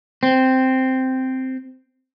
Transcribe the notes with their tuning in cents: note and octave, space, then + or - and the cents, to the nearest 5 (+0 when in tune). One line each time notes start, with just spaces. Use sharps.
C4 -5